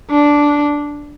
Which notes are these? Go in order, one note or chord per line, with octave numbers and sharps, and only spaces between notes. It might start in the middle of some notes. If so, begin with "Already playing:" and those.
D4